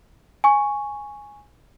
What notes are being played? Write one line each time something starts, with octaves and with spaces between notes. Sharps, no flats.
G#5 C#6